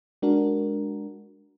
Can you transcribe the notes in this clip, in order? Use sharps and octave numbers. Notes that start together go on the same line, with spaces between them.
G#3 D4 F#4 A#4